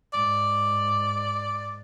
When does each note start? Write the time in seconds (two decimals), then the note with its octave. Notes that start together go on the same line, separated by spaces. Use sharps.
0.14 G#2 D5